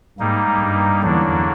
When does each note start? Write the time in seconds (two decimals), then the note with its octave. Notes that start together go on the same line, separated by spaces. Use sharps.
0.20 G#2 G3 A#3 D#4
0.60 G2
1.02 E2 D3 F#3 A#3 D4